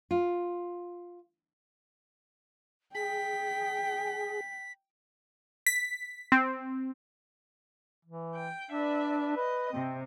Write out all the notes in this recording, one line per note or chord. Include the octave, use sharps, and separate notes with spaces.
F4
G#4 G5 B6
B6
C4
E3
G5
D4 B4 D5 E5
B4 D#5
C3 C4